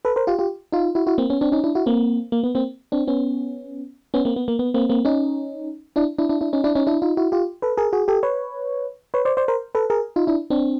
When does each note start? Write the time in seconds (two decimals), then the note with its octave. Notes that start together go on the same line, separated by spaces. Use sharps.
0.05 A4 B4
0.16 A#4 C5
0.27 F4 G4
0.39 F4 G4
0.72 D#4 F4
0.95 E4 F#4
1.07 E4 F#4
1.18 A#3 C4
1.30 B3 C#4
1.41 C4 D4
1.52 C#4 D#4
1.64 D4 E4
1.75 E4 F#4
1.86 A#3 C4
2.32 A#3
2.44 B3
2.55 A#3 C4
2.92 C4 D4
3.07 B3 C#4
4.14 B3 C#4
4.25 A#3 C4
4.36 B3
4.48 A#3
4.59 B3
4.74 A#3 C4
4.89 A#3 C4
5.05 C#4 D#4
5.96 D4 E4
6.18 D4 E4
6.29 D4 E4
6.41 D4 E4
6.53 C#4 D#4
6.64 D4 E4
6.75 C#4 D#4
6.87 D4 E4
7.02 D#4 F4
7.17 E4 F#4
7.32 F4 G4
7.62 A4 B4
7.77 G#4 A#4
7.93 F#4 G#4
8.08 G4 A4
8.23 B4 C#5
9.14 B4 C#5
9.25 C5 D5
9.37 C5 D5
9.48 A#4 C5
9.75 A4 B4
9.90 G#4 A#4
10.16 D#4 F4
10.27 D4 E4
10.50 C4 D4